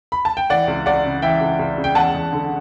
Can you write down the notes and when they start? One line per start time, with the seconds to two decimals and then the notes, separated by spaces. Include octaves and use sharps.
0.12 B5
0.25 A5
0.37 G5
0.50 E3 D5 F#5
0.68 C#2
0.86 C#2 D5 F#5
1.05 C#3
1.22 E3 E5 G5
1.41 C#2
1.59 C#2
1.78 C#3
1.84 G5
1.95 E2 F#5 A5
2.14 E2
2.33 D3